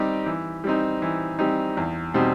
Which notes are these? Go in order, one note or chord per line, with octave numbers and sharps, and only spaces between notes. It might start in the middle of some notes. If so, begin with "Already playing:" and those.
Already playing: G3 C4 D#4 G4
E3
G3 C4 D#4
E3
G3 C4 D#4
E2
B2 G3 C4 D#4